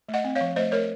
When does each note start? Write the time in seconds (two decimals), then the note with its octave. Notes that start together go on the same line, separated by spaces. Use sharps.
0.09 A3
0.14 D#5 F#5
0.24 C4
0.36 C#5 F5
0.41 F3
0.56 A3 C5 D#5
0.72 A3 A#4 C#5